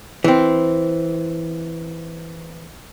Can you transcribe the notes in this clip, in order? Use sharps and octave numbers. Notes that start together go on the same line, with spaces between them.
E3 C4